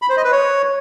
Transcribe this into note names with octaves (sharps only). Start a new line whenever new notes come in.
B5
C5
D#5
B4
C#5